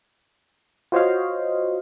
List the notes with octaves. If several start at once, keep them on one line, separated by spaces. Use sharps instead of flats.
F4 F#4 C5 C#5 D#5 F5